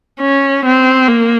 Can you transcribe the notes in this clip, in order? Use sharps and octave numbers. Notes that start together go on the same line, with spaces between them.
C#4
C4
A#3